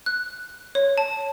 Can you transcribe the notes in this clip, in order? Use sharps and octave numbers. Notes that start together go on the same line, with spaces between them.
F#6
C#5
A5